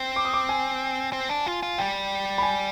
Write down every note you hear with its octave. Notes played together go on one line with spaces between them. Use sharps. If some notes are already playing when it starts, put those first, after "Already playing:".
Already playing: C4
D6
D#6
D6
G#5
C4
D4
F4
F4
G3 G5
B5
G#5